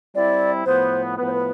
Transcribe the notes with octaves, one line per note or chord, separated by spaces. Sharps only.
G3 C4 E4 D5
A2 F3 B3 C5
A2 F3 B3 B4
C5
B4